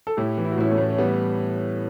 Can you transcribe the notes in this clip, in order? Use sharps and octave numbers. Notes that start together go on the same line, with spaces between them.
A4
A2 E4 G4
E3
E4
F#4
A2 C#4 E4
A3 C#4
A2
C#4
E3 G3 B3